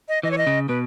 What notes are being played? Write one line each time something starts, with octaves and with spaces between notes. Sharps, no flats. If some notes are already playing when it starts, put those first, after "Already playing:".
D#5
E3 D#5
C#5
D#5
C#3
B2 B4